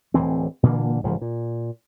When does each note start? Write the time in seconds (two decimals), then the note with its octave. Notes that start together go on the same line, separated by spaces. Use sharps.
0.14 D1 D#2 E3 C4
0.63 A#2 D3 E3 A#3
1.04 A1 G#2 C#3 F3
1.21 A#2